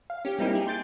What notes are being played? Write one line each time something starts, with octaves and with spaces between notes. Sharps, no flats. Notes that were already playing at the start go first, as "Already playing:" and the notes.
F5
C#4 G4
G3 A#3 C4 D#4 E4 G4
G4 G#4
C6 G6 A6 D7